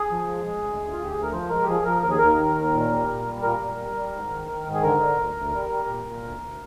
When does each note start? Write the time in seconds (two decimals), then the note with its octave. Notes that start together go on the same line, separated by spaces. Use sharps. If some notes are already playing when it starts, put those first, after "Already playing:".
Already playing: G#4
0.11 F3
0.27 G#3
0.46 G#3
0.63 D2
0.80 D2
0.92 F4
0.97 D2
1.03 G4
1.12 D2 G#4
1.23 A#4
1.32 F3 C5
1.49 G#3 A#4
1.62 G4
1.68 F3 G#4
1.85 F3 A#4
2.02 D#2 A#4
2.11 G#4
2.18 D#2 A#4
2.37 D#3
2.55 D#2
2.73 A#2
2.89 G3
3.07 A#2
3.25 G3
3.42 A#2 A#4
3.60 A#2
3.78 G3
3.95 G3
4.12 G#2
4.30 D#3
4.48 D#3
4.65 G#2
4.74 G#4
4.83 D3 A#4
5.00 D3
5.17 D2
5.35 D2
5.53 G3
5.69 G3
5.88 A#2
6.06 A#2
6.22 D2
6.40 D2